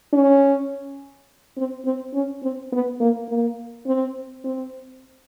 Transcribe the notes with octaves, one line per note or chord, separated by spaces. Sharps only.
C#4
C4
C4
C#4
C4
B3
A#3
A#3
C4
C4